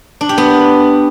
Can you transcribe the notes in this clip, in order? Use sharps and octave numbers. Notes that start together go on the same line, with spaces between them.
D4
G4
B3